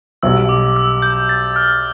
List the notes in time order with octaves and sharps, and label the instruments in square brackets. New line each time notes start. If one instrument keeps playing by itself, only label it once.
[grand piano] B1 B2 G3 [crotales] E6
[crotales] D6
E6
G6
A6
F6